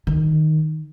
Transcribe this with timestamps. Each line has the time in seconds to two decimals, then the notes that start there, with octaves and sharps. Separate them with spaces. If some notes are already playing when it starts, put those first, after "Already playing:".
0.07 D#3